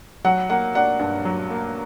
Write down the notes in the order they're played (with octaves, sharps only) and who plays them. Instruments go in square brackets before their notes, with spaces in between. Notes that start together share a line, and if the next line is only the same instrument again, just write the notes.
[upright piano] F#3 F#5
A#3 F#5
D4 F#5
G2
F#3
A#3